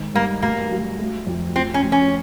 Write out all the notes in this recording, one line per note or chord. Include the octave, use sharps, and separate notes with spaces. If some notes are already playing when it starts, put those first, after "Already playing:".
Already playing: G#2 D#3
G2 A#3
D2 A#3
F#3
A3
F2
F3 C4
C#4
D2
C#4